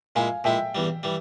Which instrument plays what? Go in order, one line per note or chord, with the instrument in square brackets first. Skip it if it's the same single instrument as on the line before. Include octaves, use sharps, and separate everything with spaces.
[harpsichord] A#2 G#3 E4 [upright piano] F5 G#5
[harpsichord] A#2 G#3 E4 [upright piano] E5 G5
[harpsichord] E2 E3 G3
E3 G3